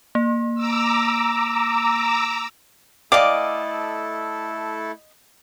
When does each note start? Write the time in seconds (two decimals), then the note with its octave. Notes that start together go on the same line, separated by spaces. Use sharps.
0.15 A#3
0.55 A#5 D6 E6
3.12 A3 E4 A4 D5 D#5 F5 G5 D6